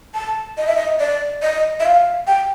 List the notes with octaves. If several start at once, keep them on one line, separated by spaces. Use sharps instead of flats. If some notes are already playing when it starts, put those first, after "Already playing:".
A5
D#5
E5
D#5
D5
D#5
E5
F5
G5